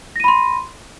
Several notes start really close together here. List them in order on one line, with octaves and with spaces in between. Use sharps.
A#6 D#7 B5 C6